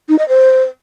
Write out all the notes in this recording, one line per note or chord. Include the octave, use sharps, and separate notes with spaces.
D#4
D#5
C5